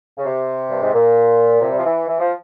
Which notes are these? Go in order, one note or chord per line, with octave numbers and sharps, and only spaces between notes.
C#3
C3
G2
G#2
A#2
C3
G3
F3
E3
E3
F3